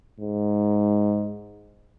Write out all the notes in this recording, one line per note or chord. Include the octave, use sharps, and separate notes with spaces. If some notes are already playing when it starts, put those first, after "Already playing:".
G#2